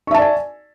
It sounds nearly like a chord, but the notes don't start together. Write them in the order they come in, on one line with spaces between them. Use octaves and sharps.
C#6 E5 A5 D5 G#5